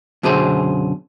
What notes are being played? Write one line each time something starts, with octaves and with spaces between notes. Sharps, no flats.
F#2 B2 D3 G#4 C5